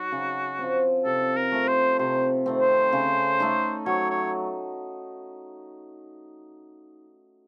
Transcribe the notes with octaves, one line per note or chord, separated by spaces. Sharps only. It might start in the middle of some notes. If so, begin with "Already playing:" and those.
Already playing: F#3 D#4 F#4
C#3
F3 C4
C3 A4
A#4
F3 A3
C5
C3 C5
D#3 A3 C4
C5
C#3
A3 D#4
F#3 C#5
C#5